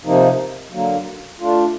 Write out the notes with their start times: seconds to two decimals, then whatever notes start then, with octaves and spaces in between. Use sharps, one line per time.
0.04 C3 F3 A#3 D#4
0.73 D3 F#3 A#3
1.40 A3 D4 F4